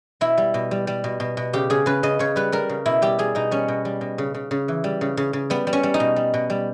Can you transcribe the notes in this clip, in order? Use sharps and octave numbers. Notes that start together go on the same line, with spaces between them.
B2 E4
G3
B2
G3
G3
B2
B2
B2
C#3 G4
C#3 G#4
C#3 B4
C#3 D#5
C#3 C#5
G3 B4
G3 A#4
C#3
B2 E4
G3 G4
G3 G#4
B2 D#4
G3 C#4
B2
G3
B2
C#3
C#3
C#3
E3
G3
C#3
C#3
C#3
G3 B3
G3
C#4
G3
D#4
B2
G3
B2
G3